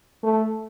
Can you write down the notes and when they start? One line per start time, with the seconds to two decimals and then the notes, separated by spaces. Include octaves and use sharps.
0.23 A3